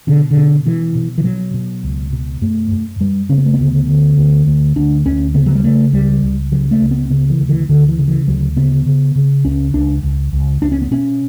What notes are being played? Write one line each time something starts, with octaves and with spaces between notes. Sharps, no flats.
B2 D3
D3
B2
B2 E3
B2
E3
B2 F#3
B2
C#2
B2
F#2 A3
F#2
F#2 G3
C#3 C#4
B3
A3
D2 B3
D3
D2
D2
D2 D4
D2 C#4
C#3 B3
F#3
G3
C#3 A3
C#2 G3
C#2
C#3 F#3
A3
C#2
B3
C#3 B3
E3
D2
E3
D2 D3
E3
C#3
E3
D2 F#3
C#3 B3
C#3
C#3
C#2 C#4
C#2 D4
C#2
C#2
C#2 D4
C#4
B3
B2 C#4